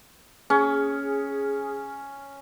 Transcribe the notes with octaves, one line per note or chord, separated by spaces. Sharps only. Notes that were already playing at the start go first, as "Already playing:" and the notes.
C#4 G#4